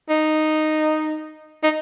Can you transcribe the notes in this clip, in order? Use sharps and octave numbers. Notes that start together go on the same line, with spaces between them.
D#4
D#4